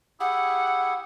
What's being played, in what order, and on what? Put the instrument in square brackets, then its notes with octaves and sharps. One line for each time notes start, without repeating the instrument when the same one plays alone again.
[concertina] E4 G4 G#4 [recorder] F#5